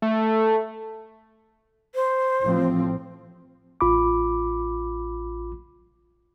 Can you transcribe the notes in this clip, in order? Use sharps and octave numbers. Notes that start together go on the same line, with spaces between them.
A3
C5
A1 F3 C4
A1 F4 B5 D6